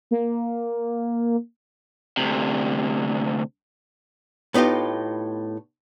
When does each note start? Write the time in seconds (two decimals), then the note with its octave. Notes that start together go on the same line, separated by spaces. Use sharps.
0.11 A#3
2.17 D2 C3
4.54 A2 B3 D#4 F4 G4